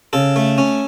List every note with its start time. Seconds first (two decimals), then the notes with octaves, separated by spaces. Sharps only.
0.13 C#3 A4
0.36 A3
0.58 C#4